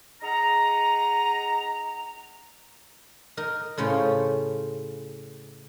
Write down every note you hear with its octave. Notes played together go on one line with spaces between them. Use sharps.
D#4 G#4 F#5 A#5
D#4 A#4
A2 C#3 C#4 F4 C5